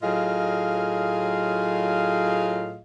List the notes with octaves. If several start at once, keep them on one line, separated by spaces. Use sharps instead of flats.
A2 F#3 F4 G#4 D#5 F5